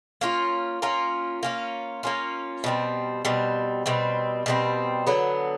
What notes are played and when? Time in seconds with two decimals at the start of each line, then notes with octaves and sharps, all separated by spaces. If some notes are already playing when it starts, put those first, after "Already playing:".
0.21 A#3 C#4 F4
0.82 A#3 C#4 F4
1.43 A#3 C#4 F4
2.03 A#3 C#4 F4
2.64 B2 G3 C4
3.25 B2 G3 C4
3.86 B2 G3 C4
4.46 B2 G3 C4
5.07 D3 F#3 B3